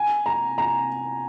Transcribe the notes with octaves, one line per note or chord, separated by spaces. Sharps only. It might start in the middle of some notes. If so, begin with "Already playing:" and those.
Already playing: G#5
A#5
A#5